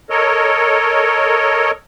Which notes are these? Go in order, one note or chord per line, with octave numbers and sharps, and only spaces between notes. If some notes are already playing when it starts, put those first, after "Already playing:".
A4 A#4 C#5 D#5